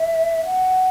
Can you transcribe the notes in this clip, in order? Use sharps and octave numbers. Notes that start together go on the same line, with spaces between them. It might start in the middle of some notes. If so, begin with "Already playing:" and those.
Already playing: E5
F#5